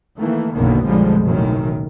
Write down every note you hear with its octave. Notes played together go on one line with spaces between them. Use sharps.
D#3 E3 A3 A#3
F#1 B1 D3 D#3 A#3 B3
B1 F2 D3 F3 G3 G#3
F#1 B1 F#2 A2 D#3